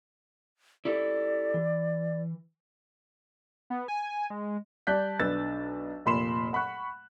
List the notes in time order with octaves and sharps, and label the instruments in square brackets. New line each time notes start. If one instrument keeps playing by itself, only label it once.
[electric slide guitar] E4 G4 A4 [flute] D5
[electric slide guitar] E3
[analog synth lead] B3
G#5
G#3
[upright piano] G3 D5 A5 F#6 G6 B6
B1 D4 B4 E6 A6
F1 A#2 B5 C6 E7
F#5 B5 C#6 F#6